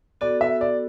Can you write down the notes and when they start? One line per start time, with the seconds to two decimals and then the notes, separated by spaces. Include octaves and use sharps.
0.21 B3 F#4 A4 D5
0.41 E5
0.61 D5